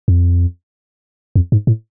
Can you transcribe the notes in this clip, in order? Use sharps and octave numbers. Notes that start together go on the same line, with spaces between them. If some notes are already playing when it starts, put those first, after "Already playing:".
F2
F2
G#2
A2